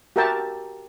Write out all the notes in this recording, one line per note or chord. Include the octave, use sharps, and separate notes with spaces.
F#4 G4 A#4 E5 G5 A5